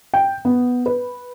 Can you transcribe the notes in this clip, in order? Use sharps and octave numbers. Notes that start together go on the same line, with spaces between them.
G5
B3
B4